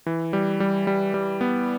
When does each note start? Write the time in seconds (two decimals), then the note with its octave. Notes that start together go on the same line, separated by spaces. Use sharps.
0.06 E3
0.33 G3
0.60 G3
0.87 G3
1.14 G3
1.41 B3